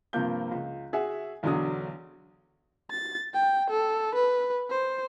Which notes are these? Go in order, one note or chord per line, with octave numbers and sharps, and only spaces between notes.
G2 C3 F3 A#3 G6
C#2
F#4 G#4 E5 F#5
B1 E2 D3 F#3 D4 D#6
A6
G5
A4
B4
C5